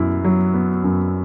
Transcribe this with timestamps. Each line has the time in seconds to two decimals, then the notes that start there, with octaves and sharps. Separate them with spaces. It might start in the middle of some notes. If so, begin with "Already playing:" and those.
Already playing: F#2 F#3 B3 E4
0.24 F#3
0.54 B3
0.84 F#2